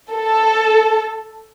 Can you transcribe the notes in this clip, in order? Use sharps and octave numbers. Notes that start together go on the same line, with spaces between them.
A4